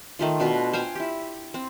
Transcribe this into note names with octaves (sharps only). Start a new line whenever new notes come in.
D#3 A3 F4
B2 D4 F4
C5 F5 G5 G#5
E4 G4
C4